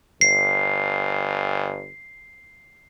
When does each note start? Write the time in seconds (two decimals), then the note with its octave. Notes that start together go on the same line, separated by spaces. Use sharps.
0.21 G1 C7